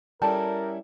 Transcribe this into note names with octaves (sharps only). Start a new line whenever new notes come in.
G3 C#4 E4 A4 A#4 D5 G5 A5